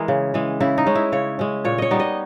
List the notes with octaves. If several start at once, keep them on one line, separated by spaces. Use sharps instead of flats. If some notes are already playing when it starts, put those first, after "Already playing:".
Already playing: E3 G#3 G#4 A#4
C#3
E3 G#3
C#3 E4
D#4
G#3 C#4
E4
C#3 C#5
G#3 C#4
A#2 C#5
C#5 D#5
G3 B3 D#4
D#5